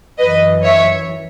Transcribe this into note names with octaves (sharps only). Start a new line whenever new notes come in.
F#2 E3 B4 D#5
C#5 E5